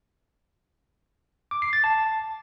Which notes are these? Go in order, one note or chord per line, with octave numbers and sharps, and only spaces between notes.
D6
C7
A6
A5